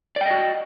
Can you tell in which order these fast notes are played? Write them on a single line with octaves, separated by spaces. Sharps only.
D5 G5 D#5 F#4